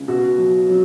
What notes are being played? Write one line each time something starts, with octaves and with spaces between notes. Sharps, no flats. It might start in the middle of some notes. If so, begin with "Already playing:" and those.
Already playing: C#2
B2 F#4
F#3
F#3